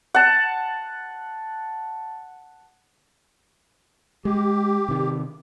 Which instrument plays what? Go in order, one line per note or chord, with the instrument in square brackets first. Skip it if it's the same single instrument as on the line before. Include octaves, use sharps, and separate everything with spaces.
[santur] F#5 A5
[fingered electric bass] G#3 [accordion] G4
[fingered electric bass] C3 D#3